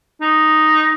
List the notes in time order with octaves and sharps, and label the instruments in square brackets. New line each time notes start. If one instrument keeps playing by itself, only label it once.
[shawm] D#4